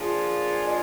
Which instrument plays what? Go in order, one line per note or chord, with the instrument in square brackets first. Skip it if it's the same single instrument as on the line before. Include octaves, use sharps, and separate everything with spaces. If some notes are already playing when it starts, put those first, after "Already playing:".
Already playing: [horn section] F3 A#3 D4 F4 G#4
[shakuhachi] D#5